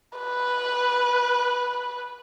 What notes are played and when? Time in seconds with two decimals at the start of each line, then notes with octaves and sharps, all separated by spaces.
0.18 B4